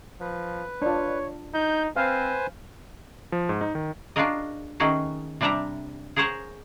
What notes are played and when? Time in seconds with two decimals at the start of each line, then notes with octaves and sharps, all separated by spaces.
0.21 F3 B4
0.82 D4 F4 C#5
1.54 D#4 G6
1.96 C4 B4 C5 F5 G#5
3.32 F3
3.49 G#2
3.61 D#4
3.75 D#3
4.16 D4 F4 F#4 G#4 A#4 D#5
4.80 D#3 A3 C#4 D#4 F#4 G#4
5.41 C3 G3 D4 D5 E5 A#5
6.16 G#4 A#4 C5 C#5 F#5 G#5